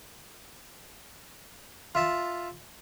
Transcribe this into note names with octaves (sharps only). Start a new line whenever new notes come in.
F4 E5 A5